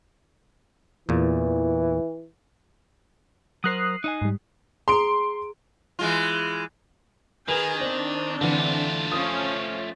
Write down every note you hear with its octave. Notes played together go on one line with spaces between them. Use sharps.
E2 A#2 E3
F#3 A#4 C5 D#6 F#6 C7
D#4 D#5 G#5
G#2 G3
G#4 A#5 C6 D7
E3 G#3 F4
D#3 G#4 A#4 B4 G#5
C4 D4 C5
D3 E3 A3 F4
F3 C#4 D#6